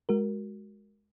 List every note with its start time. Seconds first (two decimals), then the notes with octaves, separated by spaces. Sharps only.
0.09 G#3 F#4 A#4